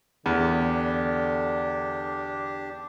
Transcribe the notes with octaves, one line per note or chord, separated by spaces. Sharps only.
E2 D3 D4 G4